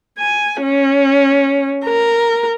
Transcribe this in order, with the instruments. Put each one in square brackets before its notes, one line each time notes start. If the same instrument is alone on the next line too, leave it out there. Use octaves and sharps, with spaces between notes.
[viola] G#5
C#4
A#4